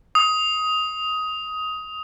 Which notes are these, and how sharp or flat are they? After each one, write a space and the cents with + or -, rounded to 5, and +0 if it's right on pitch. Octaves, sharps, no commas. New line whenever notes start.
D#6 +15